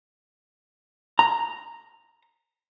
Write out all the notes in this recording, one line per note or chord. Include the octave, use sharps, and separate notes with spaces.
A#5